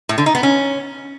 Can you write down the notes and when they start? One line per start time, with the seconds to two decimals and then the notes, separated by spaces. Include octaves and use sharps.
0.09 A2
0.18 D3
0.26 D#4
0.35 B3
0.43 C#4